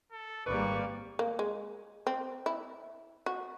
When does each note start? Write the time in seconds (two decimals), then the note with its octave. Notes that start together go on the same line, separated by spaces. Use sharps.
0.12 A4
0.46 G#1 G3 A#3 B4 D5 C#6
1.19 A#3
1.39 G#3
2.07 C4
2.46 E4
3.26 F#4